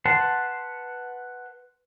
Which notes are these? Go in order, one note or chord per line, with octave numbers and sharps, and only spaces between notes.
B4 F#5 A5 C6